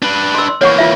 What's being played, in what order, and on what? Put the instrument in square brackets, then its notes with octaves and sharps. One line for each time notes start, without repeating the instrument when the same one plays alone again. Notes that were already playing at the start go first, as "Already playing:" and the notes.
[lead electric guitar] D4 B4
[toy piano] C6 E6
C6
[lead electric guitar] E3 A#3 [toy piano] C#5 F#5 C#6
[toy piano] F4 E5